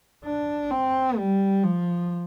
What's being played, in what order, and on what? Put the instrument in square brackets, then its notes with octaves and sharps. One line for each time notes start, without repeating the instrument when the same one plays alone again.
[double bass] D4
C4
G3
F3